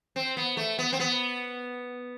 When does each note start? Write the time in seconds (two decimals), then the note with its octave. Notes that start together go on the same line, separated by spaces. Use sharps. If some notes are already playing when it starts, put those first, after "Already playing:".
0.16 C4
0.37 B3
0.57 A3
0.79 B3
0.93 C4
1.00 B3